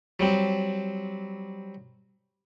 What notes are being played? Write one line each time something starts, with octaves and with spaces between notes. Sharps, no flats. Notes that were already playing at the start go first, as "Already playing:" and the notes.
F#3 G3 C4